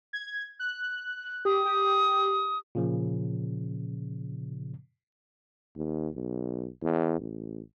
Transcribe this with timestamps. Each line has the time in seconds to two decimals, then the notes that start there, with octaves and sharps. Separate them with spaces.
0.13 G#6
0.59 F#6
1.45 G4 D#6
1.65 G4
2.75 A#2 C#3 F3
5.77 D#2
6.15 B1
6.83 E2
7.20 A1